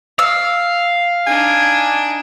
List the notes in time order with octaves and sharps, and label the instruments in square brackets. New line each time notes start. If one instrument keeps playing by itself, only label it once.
[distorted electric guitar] F5 [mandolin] E6
[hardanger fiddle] D4 D#4 [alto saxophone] G#5